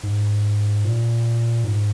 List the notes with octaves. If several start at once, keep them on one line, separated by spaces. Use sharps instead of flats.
G#2
A#2
G#2